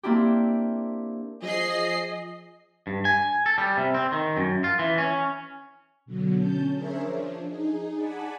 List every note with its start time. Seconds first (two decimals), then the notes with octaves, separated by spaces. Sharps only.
0.03 A#3 C4 D4 E4 G4
1.43 F3 G#4 D#5 C7
2.87 G2
3.05 G#5
3.46 A4
3.58 G3
3.77 C3
3.94 C4
4.12 D#3
4.37 F#2
4.64 F4
4.79 E3
4.98 C#4
6.06 B2 D3 F#3
6.37 C#4 A5 G6
6.73 D4 G#4 A#4 C5 C#5 E5
7.05 F3 D4
7.47 D#4 G#4
7.95 D5 F#5 G#5 A5 B5